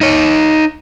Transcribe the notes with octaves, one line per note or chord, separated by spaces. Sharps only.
D#4 C#5